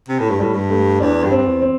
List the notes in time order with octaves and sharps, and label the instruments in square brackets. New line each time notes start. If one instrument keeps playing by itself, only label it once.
[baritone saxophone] C3
A2
G2
[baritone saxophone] A2 [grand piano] G3
[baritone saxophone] G2
[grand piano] A3
[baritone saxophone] E2 [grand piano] D4
[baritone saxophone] G2
[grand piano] C4
[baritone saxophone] G2
E2
[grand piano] C4